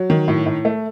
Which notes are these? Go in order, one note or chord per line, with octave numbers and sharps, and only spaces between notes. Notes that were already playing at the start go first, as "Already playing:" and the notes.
Already playing: F#3
D#3
A2
A2
A3